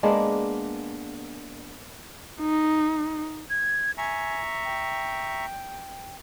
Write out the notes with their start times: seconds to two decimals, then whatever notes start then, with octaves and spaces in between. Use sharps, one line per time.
0.03 G#3 A#3 B3 D4
2.41 D#4
3.50 G#6
3.98 E5 G#5 A#5 C#6
4.65 G5